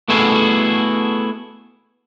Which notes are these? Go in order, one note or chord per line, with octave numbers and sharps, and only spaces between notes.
A3 B3 E4 F#4 G#4 A4